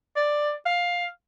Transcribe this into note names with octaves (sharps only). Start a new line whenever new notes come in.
D5
F5